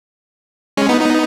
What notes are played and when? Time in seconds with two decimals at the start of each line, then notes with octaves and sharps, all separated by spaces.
0.77 G#3 C#4
0.89 B3 D#4
1.01 B3 D#4